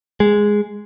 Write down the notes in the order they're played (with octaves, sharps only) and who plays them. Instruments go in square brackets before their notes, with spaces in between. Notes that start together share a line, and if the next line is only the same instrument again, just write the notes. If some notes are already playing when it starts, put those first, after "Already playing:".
[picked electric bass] G#3